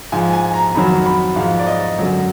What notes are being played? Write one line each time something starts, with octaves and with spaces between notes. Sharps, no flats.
G#2 F3 G#5
G#5
A#5
F2 D#3 F#3 B5
B5
G#2 F3 F5
D5
D#5
F#2 D3 F#3